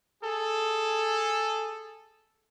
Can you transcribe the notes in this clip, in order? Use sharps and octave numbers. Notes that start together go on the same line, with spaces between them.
G#4 A4